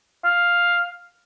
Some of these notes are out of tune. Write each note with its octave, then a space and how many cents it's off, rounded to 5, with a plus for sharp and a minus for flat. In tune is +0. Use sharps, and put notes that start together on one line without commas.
F5 +5